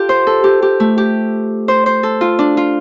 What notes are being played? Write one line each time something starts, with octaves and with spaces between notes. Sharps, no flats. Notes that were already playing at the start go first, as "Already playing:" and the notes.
Already playing: F4 G4 A4
C5
A4
G4
G4
A3
G4
C5
C5
A4
F4
D4
F4